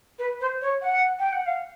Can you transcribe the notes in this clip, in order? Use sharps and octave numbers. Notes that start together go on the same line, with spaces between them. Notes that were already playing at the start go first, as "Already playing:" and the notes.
B4
C5
C#5
F#5
G5
F#5
F5